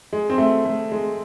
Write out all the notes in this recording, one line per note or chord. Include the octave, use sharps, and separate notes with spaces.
G#3
C4
A3
A3
G#3